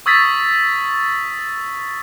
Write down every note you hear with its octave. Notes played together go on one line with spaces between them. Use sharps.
C#6 D#6 E6 G#6 A6 B6